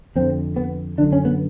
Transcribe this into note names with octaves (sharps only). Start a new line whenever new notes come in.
F2 D3 C4
B3
F#2 D3 D4
C#4
B3